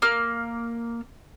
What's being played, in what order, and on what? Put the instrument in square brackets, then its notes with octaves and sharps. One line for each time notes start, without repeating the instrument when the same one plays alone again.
[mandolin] A#3 F6